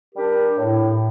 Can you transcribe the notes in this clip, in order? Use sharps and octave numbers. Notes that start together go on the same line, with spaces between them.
G3 D4 G4 A#4
A2